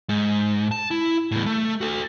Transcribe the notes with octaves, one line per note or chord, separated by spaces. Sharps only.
G#2
A5
E4
E2 A2
A3
F#4 A4